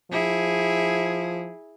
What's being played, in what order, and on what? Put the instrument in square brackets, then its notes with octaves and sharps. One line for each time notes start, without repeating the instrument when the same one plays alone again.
[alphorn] F3 [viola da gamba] E4 G#4